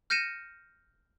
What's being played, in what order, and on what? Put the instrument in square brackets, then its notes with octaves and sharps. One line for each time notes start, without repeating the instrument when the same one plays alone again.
[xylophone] F6 G6 A#6 C#7 D#7 E7